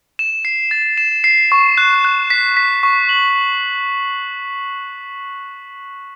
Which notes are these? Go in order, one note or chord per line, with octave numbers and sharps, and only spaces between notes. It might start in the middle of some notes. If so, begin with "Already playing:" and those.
E7
C7
A6
E7
C7
C#6
F#6
F#6
B6
B6
C#6
F#7